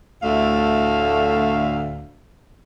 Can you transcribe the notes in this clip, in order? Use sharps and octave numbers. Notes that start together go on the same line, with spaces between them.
D2 A2 D3 A3 E5 F5